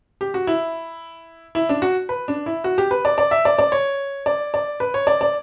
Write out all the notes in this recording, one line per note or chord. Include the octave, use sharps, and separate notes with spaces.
G4
F#4
E4
E4
D4
F#4
B4
D4
E4
F#4
G4
B4
D5
D5
E5
D5
D5
C#5
D5
D5
B4
C#5
D5
D5